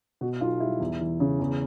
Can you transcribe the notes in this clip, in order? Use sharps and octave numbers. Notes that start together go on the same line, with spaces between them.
B2 F#4
B1 F4
G3 E4
E2
E3
C#3
E2